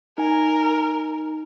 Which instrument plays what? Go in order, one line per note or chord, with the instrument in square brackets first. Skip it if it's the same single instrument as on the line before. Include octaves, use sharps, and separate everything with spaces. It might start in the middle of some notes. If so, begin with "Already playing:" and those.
[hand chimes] D#4 G#5 [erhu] A#4